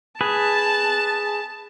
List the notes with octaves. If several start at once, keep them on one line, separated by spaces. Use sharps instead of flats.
G#4 B4 A5